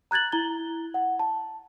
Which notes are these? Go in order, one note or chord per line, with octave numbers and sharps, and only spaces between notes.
A#5 F#6 G#6 A6 F#7
E4 A#5 G7
F#5
A5